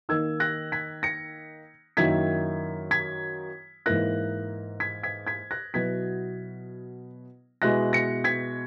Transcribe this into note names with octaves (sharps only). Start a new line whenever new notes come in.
D#3 A#3 D#4 E6 G#6
F#6 A#6
G#6 B6
A#6 C#7
F#2 D#3 A#3 E4 G#6 B6
G#6 B6
G#2 E3 A#3 E4 F#6 A#6
G#6 B6
G#6 B6
G#6 B6
F#6 A#6
B2 F#3 B3 E4 G#6 B6
B2 G#3 B3 E4 F#6 A#6
A#6 C#7
G#6 B6